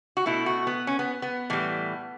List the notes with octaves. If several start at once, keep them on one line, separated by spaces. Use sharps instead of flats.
F#4
B2 A3 E4
F#4
B3
C#4
B3
B3
A2 E3 G3